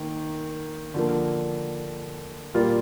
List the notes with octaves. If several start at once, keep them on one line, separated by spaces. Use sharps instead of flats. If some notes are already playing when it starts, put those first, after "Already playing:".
Already playing: D#3 A#3
D3 F3 A#3
A#2 G3 A#3 F4